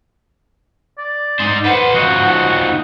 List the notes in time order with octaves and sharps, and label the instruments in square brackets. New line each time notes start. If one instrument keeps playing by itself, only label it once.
[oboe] D5
[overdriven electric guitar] D#4 C5
[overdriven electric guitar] B4 C5 [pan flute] F#5
[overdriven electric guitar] F3 D#4 [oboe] F#4